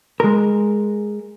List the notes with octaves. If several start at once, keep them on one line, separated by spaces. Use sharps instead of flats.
G#3 A#4